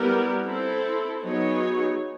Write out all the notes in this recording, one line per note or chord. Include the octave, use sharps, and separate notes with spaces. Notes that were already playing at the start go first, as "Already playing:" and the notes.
Already playing: G3 B3 E4 G4 A#4
C4 E4 A4
F#3 B3 D#4 G#4 C#5